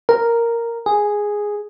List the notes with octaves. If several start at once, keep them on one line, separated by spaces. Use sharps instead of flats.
A#4
G#4